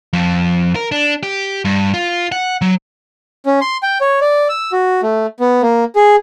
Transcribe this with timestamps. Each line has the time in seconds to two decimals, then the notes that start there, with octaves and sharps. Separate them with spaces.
0.13 F2
0.76 A#4
0.92 D4
1.23 G4
1.65 G2
1.94 F4
2.32 F#5
2.62 F#3
3.45 C#4
3.61 C6
3.83 G5
4.01 C#5
4.21 D5
4.49 E6
4.72 F#4
5.03 A3
5.40 B3
5.62 A#3
5.96 G#4